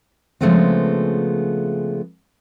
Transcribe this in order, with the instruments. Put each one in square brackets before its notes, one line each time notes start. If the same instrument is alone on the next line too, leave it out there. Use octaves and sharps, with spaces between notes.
[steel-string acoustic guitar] C#3 F3 G#3 A3 B3 C4